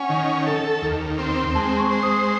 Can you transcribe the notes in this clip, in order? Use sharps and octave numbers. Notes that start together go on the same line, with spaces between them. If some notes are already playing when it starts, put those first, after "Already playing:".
Already playing: C#4 F#5 G#5
D#3
A4
D#2
C4
G#3 A5
C6
C#6
C5
D#6